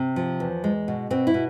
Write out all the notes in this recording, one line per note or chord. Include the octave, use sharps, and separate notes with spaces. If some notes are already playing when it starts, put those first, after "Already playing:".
Already playing: C3
F3
E2
G#3
B2
B2 C4
E4
B2